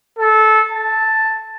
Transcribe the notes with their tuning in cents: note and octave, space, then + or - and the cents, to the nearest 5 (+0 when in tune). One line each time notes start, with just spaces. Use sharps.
A4 -20
A5 +5